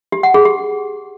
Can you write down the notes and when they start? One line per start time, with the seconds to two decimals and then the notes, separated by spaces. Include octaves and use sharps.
0.12 G4
0.23 F#5
0.34 G#4
0.45 G4